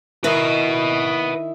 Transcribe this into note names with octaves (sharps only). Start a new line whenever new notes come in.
D#3 E4 B4 D#5